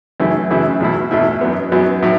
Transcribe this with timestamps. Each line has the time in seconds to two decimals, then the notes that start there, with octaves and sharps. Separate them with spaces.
0.20 F#2 C#3 E3 A3 E4
0.50 F#2 C#3 E3 A3 E4
0.80 E2 B2 A3 E4
1.11 E2 B2 A3 E4
1.41 F#2 F#3 B3
1.72 F#2 F#3 B3
2.03 A2 F#3